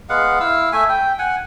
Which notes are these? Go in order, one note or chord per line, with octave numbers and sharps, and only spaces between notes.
G#3 B3 F5 F#5
E4 F5 E6
A3 E5 G#5
G5
F#5 G#5